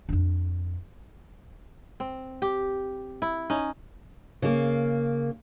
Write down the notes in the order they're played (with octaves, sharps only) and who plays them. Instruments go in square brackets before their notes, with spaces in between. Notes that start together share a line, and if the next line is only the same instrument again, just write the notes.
[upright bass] F2 D4
[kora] C4
G4
E4
C#4 D#4
[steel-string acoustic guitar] C#3 A#3